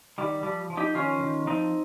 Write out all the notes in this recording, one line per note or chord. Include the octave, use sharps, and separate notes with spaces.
D#3 G3
F3 G3
F3
D#4 G4
D#3 C#4 F4
D#3
F3 C4 D#4